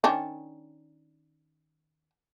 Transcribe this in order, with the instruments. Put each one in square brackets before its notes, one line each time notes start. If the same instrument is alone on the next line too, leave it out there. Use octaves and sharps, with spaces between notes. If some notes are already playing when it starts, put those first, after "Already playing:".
[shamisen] D#3 C#4 D4